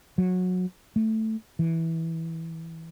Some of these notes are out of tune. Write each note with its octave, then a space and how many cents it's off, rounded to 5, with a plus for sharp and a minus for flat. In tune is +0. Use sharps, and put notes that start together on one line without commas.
F#3 -20
A3 +5
E3 -10